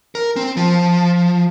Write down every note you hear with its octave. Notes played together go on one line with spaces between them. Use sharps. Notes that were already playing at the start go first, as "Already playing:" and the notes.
A#4
C4
F3